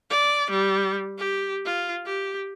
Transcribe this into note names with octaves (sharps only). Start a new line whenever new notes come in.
D5
G3
G4
F4
G4